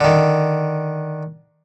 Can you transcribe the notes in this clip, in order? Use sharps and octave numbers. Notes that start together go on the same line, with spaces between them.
D3 D#3